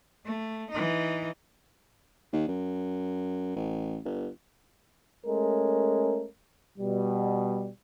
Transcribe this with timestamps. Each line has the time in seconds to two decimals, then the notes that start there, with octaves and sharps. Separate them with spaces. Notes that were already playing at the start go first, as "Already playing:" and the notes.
0.25 A3
0.71 E3 D#4
2.33 D#2
2.48 F#2
3.56 A1
4.05 G1
5.25 G#3 A3 C#4 A4 A#4
6.78 B2 G3